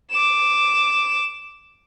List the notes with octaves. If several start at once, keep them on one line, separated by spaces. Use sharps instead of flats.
D6 E7